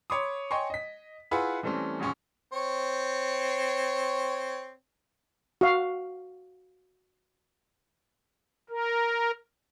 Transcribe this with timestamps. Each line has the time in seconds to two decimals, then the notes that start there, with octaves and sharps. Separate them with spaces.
0.10 C#5 B5 C6 D6 D#6
0.51 C#5 D#5 G5 G#5 C6 C#6
0.70 D#5 B6
1.31 E4 F4 G#4 B4 E5 F#5
1.63 E3 G3 A3 C4 C#4
2.00 D#1 A1 G#3 C#4 G#5 C#6
2.53 C4 C#5
5.61 F#4 F5
8.70 A#4